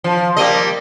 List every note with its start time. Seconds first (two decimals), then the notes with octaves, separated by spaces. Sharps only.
0.04 F3
0.37 G3 A#3 D#5